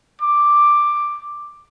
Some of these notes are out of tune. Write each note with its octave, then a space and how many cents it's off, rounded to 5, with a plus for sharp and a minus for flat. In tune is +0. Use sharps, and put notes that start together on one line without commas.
D6 +5